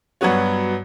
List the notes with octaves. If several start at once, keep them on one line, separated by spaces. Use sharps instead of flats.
G2 F#3 B3 F#4 C#5